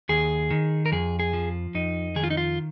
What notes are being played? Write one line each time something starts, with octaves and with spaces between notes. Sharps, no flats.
D#2 G#4
D#3
A#4
F2 G#4
G#4
F3
F2 D#4
D#3 G#4
F4
D#4
F4